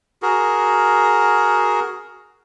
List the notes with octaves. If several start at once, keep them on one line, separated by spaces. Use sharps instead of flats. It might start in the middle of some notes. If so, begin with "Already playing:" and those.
F#4 G#4 A#4